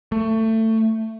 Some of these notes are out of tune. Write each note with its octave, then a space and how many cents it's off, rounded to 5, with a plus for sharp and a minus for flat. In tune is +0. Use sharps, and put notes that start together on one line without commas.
A3 +20